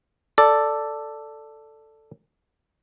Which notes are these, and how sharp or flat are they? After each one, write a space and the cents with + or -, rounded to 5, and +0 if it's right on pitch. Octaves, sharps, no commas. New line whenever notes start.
A4 +5 D5 +0